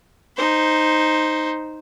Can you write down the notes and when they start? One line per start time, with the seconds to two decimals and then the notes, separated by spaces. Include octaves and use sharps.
0.37 D#4 C5